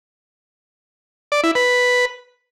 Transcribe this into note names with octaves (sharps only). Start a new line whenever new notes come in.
D5
E4
B4